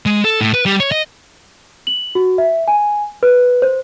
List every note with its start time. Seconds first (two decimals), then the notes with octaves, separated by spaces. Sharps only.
0.06 G#3
0.25 A4
0.41 A2
0.54 B4
0.66 G3
0.80 C#5
0.92 D#5
1.87 F#7
2.15 F#4
2.38 E5
2.68 G#5
3.23 B4
3.62 C5